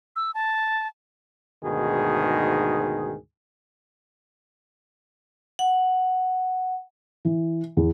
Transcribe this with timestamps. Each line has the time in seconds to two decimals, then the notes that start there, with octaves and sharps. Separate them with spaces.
0.16 E6
0.34 A5
1.64 D2 G#2 B2 D#3 G#4
5.59 F#5
7.25 E3
7.77 E2